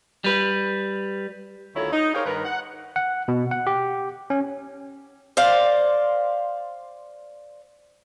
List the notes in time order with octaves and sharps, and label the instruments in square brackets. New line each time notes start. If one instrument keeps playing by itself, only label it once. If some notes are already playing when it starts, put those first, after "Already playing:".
[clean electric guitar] G3 B4
[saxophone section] D2 D#3 E4 F4 A4 C#5
D#4
G4 G#4 A#4 C5 C#5 F5
G2 D#3 A#4 B4
F#5
[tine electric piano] F#5
B2
F#5
G4
C#4
[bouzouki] C5 D5 F5